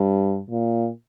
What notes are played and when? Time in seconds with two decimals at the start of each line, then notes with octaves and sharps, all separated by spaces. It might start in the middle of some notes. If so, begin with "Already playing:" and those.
Already playing: G2
0.50 A#2